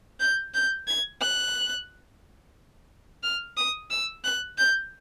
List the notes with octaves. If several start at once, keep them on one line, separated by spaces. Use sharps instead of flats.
G6
G6
G#6
F#6
F6
D#6
E6
F#6
G6